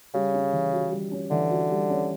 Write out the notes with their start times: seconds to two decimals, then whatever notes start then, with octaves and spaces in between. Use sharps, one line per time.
0.14 C#3 G3
0.34 C#4
0.53 E3
0.73 F#4
0.91 G3
1.12 C#4
1.31 D3 E3
1.50 F#4
1.70 G3
1.90 C#4